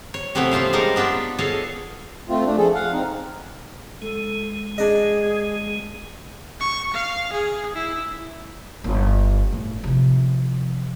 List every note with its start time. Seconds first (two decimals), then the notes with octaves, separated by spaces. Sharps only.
0.14 C#5
0.35 C3 E3 A3 B3 B4 C#5
0.52 F3 C#4 F4 C5 F5
0.73 G3 G#3 D#4 A#4 F5
0.96 B3 D4 F4 B4
1.39 G#4 A4 C#5 D#5 F5
2.29 A3 C4 F4
2.46 A3 D4
2.58 F3 G#4 A4
2.74 F5 F#5
2.92 C4 D#4
4.02 G#3 A4
4.78 D4 G#4 D#5
6.60 C#6
6.93 F5
7.33 G#4
7.75 E4
8.84 G1
9.53 A2
9.84 C3 F3